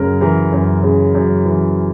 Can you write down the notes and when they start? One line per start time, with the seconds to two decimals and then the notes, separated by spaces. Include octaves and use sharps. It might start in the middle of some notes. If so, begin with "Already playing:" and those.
Already playing: F#2 C#3 A#4
0.21 E3 A#4
0.52 F#2 A#4
0.83 C#3
1.15 F#2
1.45 E3